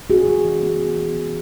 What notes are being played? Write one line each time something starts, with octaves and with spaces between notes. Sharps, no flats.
C#4 F#4 G#4
E3
E3
B3
E3
B3
E3